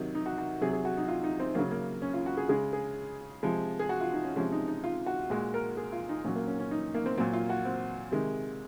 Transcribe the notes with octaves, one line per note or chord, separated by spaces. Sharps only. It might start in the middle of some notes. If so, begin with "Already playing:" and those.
Already playing: C3 D#3 F#3 D#4
D#4
F#4
F#4
C3 F#3 G#4
G#4
F#4
D#4
F4
D#4
C4
C#3 F#3 A#3
A#3
C#4
F4
F#4
G#4
C#3 G#3 G#4
G#4
C3 F3 G#3
G#4
F#4
F4
D#4
C#4
C3 F3 G#3 C#4
D#4
D#4
F4
F#4
A#2 G#3 F#4
A#4
G#4
F4
D#4
A#2 F#3 C#4
A#3
C#4
C#4
D#4
A#3
C4
A#2 F#3 C4
F4
F#4
C4
C3 D#3 G#3